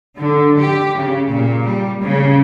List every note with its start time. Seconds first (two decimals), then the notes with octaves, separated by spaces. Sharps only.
0.17 D3
0.57 G4
0.97 C#3
1.30 A#2
1.65 G3
2.03 C#3